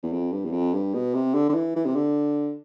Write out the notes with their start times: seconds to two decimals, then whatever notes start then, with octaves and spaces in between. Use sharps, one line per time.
0.03 E2
0.13 F2
0.32 G2
0.45 E2
0.52 F2
0.74 G2
0.94 B2
1.14 C3
1.34 D3
1.49 D3
1.54 E3
1.76 E3
1.86 C3
1.96 D3